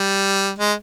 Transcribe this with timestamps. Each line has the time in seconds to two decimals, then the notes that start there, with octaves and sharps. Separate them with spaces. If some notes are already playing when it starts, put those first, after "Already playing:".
Already playing: G3
0.59 G#3